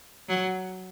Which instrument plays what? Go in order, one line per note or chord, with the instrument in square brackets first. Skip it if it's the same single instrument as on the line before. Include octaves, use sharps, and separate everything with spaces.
[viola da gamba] F#3